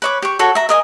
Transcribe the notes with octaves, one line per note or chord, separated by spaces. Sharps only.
B4 C#5 D6
G4 C#6
F#4 A4 C#5
E5 A#5
A#4 D#5 G#5